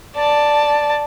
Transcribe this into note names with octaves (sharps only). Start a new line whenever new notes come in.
D5 A5